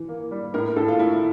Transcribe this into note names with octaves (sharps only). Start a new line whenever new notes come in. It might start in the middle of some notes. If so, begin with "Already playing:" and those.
Already playing: E3
A#3
G3
A2 A#4
A2 A4
F4
A3 E4